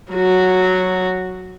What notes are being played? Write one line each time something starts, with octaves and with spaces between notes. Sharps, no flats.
F#3 F#4